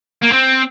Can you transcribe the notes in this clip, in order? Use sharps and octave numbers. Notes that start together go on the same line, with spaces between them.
A#3
C4